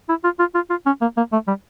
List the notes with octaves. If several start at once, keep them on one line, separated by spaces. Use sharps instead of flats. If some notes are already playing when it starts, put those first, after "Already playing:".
E4
F4
F4
F4
F4
C#4
A#3
A#3
A3
G3